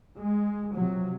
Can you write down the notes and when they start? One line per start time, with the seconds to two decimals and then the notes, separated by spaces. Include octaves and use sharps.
0.16 G#3
0.73 C3 F3 F#3